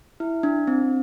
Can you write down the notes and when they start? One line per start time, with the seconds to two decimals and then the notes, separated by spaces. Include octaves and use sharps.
0.20 E4
0.43 D4
0.67 C4